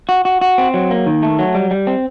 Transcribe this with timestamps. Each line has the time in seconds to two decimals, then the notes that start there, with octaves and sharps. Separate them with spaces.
0.09 F#4
0.25 F#4
0.41 F#4
0.58 C4
0.74 F#3
0.91 A#3
1.06 D#3
1.23 A3
1.39 F#3
1.55 G3
1.71 G3
1.87 C4